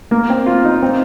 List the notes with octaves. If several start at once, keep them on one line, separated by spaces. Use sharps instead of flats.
A#3
C4
F4
D#4
C4